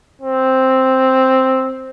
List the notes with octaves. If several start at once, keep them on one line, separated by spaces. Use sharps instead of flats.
C4